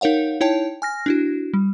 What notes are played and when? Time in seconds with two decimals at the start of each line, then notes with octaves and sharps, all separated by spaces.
0.01 D#4 A#4 C#5 F5 F#5
0.41 D#4 E4 C#5 G5 A5
0.82 G#5 F6 A#6
1.06 D4 E4 F#4
1.54 G3